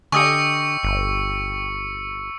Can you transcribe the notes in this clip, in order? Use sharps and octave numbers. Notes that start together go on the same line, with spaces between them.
D3 G4 D#5 G#5 C#6 E6 C#7
G1